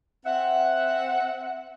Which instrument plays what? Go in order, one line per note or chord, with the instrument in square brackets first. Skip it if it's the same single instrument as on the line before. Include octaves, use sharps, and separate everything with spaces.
[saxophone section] C4 E5 F#5